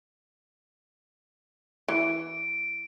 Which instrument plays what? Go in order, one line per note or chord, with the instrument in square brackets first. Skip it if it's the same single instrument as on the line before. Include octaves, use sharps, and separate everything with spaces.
[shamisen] E3 [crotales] D7